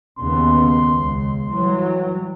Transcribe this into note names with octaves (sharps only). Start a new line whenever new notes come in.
D#2 C#3 B3 C6
C#2
E3 F#3 G3